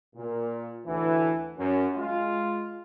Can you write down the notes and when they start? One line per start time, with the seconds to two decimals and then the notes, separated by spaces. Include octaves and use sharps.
0.15 A#2
0.86 D2 A2 D3 E3
1.57 F#2
1.95 G#3 F4